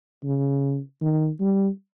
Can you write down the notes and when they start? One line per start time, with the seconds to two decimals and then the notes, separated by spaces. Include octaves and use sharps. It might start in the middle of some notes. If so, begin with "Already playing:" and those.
0.24 C#3
1.02 D#3
1.41 G3